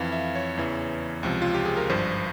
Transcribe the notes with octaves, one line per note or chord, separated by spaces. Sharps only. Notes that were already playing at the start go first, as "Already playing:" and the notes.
Already playing: F2 E3 F5
E5
C#5
E2 C#3 E3
C#2 C3 F3
F4
G4
G#4
A#4
G#1 G2 F3 C5